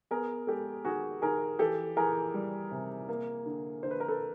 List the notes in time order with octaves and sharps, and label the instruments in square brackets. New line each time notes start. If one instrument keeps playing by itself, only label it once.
[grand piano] B3 G#4 A#4
G#3 G4 A4
D#3 F#4 G#4
D#3 G#4 A#4
E3 G4 A4
E3 G#4 A#4
G3
C3
A#3
D3
D3 C5
B4
A#4
A4 B4